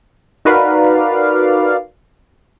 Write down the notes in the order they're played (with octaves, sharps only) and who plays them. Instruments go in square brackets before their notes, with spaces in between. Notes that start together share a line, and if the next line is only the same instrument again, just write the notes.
[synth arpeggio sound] D#4 F#4 A#4 B4 D5 F5